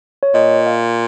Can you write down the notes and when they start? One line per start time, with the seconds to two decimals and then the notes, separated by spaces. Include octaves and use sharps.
0.23 C#5
0.34 A#2 D#5
0.66 F5